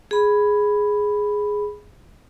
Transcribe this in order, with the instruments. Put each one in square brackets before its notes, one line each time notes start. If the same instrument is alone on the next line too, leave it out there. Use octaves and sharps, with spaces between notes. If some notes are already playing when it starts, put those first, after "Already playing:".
[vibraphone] G#4 B5